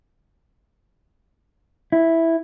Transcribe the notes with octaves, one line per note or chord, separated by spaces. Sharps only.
E4